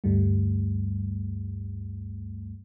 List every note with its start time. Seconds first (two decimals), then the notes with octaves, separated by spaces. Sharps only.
0.04 D2 G2 G3 A3